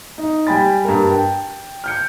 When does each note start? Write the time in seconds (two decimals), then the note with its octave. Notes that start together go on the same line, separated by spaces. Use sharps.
0.18 D#4
0.47 G3 G5 G#5 B5 A6
0.85 G2 A#4
1.11 G5
1.84 F6 G6 C#7